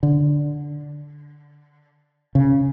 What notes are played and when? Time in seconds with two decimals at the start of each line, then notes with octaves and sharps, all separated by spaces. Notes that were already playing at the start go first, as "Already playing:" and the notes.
0.03 D3
2.35 C#3